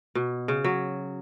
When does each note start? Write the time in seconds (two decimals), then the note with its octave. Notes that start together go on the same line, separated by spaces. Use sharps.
0.15 B2
0.48 C#3
0.64 F#3